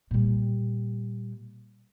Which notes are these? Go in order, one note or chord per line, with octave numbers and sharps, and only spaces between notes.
A#2 G3